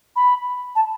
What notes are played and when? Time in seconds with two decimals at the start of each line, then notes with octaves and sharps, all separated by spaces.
0.16 B5
0.75 A5